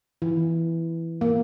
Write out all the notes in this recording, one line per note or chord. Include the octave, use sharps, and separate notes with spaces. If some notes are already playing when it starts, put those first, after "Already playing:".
E3
A#3